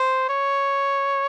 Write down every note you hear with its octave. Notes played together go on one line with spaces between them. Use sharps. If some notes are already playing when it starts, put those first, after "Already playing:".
Already playing: C5
C#5